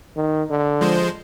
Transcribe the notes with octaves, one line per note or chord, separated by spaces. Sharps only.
D#3
D3
F3 G#3 C5